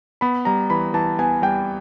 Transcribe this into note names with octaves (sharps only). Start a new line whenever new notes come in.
B3 B5
G3 A#5
E3 B5
E3 A5
B3 G#5
G3 G5